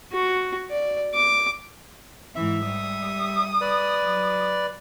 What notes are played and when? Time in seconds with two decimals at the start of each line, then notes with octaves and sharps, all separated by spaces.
0.12 F#4
0.70 D5
1.14 D6
2.36 G#2 E3 E5
2.65 G3 D#6
3.61 B4 D5
4.01 F#3